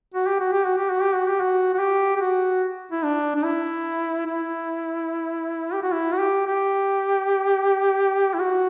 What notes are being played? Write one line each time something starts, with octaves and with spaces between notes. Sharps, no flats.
F#4
G4
F#4
G4
F#4
G4
F#4
G4
F#4
G4
F#4
F#4
G4
G4
F#4
E4
D4
D4
E4
E4
G4
F#4
E4
F#4
G4
G4
E4
F#4